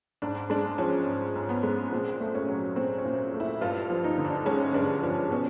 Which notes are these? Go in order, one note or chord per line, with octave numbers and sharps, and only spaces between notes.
G#2 D4
G#3 D4
F3 C#4
G#2
G#2
B3
G#3
A#2 C4
A3
C#4
F#3
A#2 C4
C#4
A#2
A3
E4
G2 F4
F3
D#4
D3
D4
G#3 C#4
G2 D4
F3 D4
B2 C#4